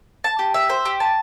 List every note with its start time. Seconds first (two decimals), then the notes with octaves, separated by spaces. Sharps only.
0.24 A5
0.39 G4
0.54 E5
0.69 C5
0.85 G4
1.00 A5